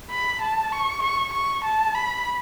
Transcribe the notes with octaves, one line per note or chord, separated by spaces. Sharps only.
B5
A5
C#6
C#6
C#6
A5
B5